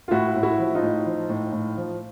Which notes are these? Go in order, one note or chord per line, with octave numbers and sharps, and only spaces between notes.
F4
A2 E4 F#4
A2
E4 F#4
F3
D#4 F4
A2
F3
A2
A2
F3